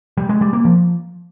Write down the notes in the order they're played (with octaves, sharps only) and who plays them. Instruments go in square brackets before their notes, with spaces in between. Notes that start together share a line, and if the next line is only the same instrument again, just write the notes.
[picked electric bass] G3
G#3
G3
A#3
F3